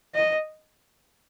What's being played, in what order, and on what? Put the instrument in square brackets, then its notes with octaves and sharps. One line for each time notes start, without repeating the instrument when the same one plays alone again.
[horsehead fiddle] D#5